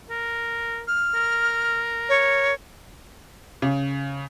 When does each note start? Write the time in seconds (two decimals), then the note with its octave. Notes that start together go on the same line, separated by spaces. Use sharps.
0.10 A#4
0.88 F6
1.15 A#4
2.09 C#5
3.62 C#3